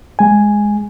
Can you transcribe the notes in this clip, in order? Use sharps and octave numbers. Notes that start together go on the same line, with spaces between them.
G#3 G#5